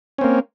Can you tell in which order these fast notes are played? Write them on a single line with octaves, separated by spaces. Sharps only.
C#4 C4 A#3